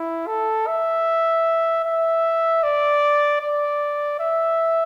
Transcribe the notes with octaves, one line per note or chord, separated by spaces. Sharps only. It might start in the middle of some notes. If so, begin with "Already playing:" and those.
Already playing: E4
A4
E5
E5
D5
D5
E5